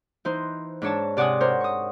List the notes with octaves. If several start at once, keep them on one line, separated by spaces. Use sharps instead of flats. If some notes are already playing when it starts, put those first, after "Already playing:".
E3 D#4 C5
G#2 D4 C#5 A5
C3 D5 F#5 G#5 D#6
A#4 C5 C#5
C#6 D#6